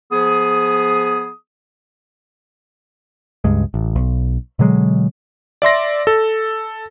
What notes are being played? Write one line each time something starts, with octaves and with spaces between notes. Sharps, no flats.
F3 B3 G#4 D#6
C#2 G2 G#3
A1
B1
B2 D3 F#3 G#3
D5 E5 C6 A#6
A4